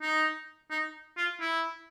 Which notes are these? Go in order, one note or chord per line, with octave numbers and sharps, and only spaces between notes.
D#4
D#4
F4
E4